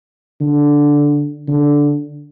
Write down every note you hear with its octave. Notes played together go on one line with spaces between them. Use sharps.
D3
D3